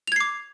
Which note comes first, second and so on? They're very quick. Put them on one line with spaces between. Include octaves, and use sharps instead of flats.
F7 G#6 C7 D6